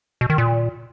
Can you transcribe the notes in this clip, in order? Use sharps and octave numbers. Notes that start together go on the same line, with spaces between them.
B2
D#3
A#2